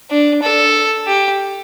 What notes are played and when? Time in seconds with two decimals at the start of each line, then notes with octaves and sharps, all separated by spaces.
0.10 D4
0.42 A4
1.07 G4